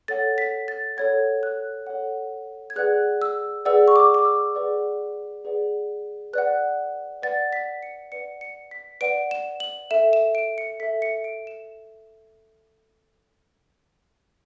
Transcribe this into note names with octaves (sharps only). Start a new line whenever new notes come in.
A4 C#5 F#5 A6
B6
A6
A4 C#5 F#5 G#6
F#6
A4 C#5 F#5
G#6
G#4 B4 D5 F#5 F#6
E6
G#4 B4 D5 F#5 E6
C#6
D6
D6
E6
G#4 B4 D5 F#5
G#4 B4 D5 F#5
B4 D5 F#5 F#6
B4 D5 F#5 A6
B6
C#7
B4 D5 F#5 C#7
C#7
B6
B4 D5 F#5 D7
E7
F#7
A4 E5 E7
E7
D7
C#7
A4 E5 B6
C#7
D7
E7